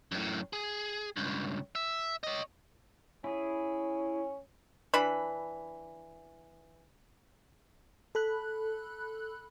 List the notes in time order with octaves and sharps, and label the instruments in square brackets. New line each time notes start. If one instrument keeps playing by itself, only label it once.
[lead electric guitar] F#2 A2
G#4
C#2 G2
E5
C#5 D#5
[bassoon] C#4 [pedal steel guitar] E4 G#4
[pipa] E3 D4 B5
[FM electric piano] A4 B5 F#6